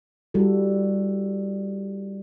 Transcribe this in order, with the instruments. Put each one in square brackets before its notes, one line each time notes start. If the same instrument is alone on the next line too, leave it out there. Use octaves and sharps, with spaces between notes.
[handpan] G3 E4 F#4 A4